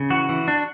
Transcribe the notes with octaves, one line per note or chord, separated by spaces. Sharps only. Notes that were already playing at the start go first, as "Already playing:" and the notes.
Already playing: C#3
E3 F#4
E3
D4